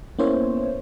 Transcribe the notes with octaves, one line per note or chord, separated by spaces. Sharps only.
A#3 B3 C#4 E4 C5 C#5